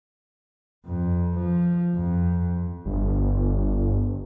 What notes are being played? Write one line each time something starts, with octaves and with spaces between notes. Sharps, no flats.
F2
F3
F2
G1